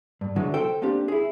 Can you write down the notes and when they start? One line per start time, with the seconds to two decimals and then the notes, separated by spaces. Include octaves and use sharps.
0.21 G2
0.36 D3 E3 F#3 G#3
0.54 A4 C5 G5
0.82 A#3 C4 D4 G4
1.08 E4 G#4